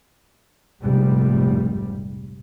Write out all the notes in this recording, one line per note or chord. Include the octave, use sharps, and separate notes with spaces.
F1 A#1 G#2 G3